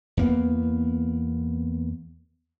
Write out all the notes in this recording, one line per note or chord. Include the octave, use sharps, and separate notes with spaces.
E2 A#3 B3